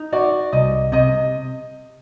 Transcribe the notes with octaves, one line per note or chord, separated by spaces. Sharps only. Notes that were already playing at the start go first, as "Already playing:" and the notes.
Already playing: D#4
F#4 D5
C2 D#5
C3 D#5